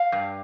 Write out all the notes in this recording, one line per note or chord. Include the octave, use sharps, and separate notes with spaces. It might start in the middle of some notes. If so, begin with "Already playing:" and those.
Already playing: F5
G2